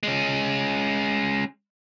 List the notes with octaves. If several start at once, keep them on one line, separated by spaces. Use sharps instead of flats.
G#3 C#4